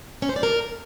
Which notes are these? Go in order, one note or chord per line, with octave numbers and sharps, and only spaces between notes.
C#4
C5
D5
A#4